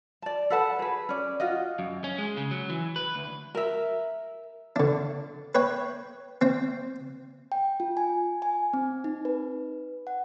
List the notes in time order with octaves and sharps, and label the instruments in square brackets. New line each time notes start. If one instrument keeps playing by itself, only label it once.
[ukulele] D5 A5
A4 B4 F#5 A5
G#4 B4
C#4 D5
F4 F#4 D#5
[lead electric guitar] F#2
C#4
G#3
C#3
F#3
E3
B4
D2
[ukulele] A#4 E5
[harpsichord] D3 D4
B4 C#5 G5
C4 G5
[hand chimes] G5
F4
G#5
G#5
C4
D#4
B4
F#5